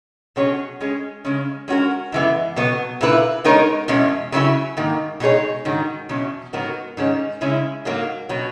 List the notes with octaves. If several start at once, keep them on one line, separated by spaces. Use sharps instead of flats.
B2 F#3 C#4 G#4 C#5
G#3 C#4 G#4
C#3 G#3 C#4
G#3 C#4 F#4 A#4
F#2 E3 G#3 B3
B2 F#3 B3
A#2 A#3 E4 B4
G#3 B3 D#4 A#4 C#5
E2 B2 G#3 C#4
C#3 F#3 A#3 C#4 E4
G#2 D#3 A#3
B2 G#3 D#4 G#4 C#5
G#2 D#3 F#3
E2 B2 F#3 C#4
G#2 F#3 B3 F#4 A#4
G#2 D#3 G#3 C#4
C#3 G#3 C#4 E4
G#2 F#3 A#3
B2 F#3